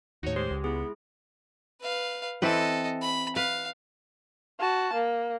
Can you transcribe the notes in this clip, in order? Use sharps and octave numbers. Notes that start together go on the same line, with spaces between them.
D#2 A2 D#4 F#4 C#5
G#3 G4 C5
C#2
B3 E4 G#4
B4 F5
E3 C4 A4 B4 D#5
B5
B4 F5
F#4 A5
A#3